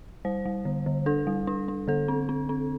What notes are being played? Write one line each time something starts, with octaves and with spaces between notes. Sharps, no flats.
G3 C5
G3
D3
D3
D4 A4
G3
D4
D4
D3 A4
C4
C4
C4